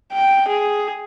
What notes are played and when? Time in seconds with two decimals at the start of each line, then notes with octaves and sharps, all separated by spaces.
0.13 G5
0.48 G#4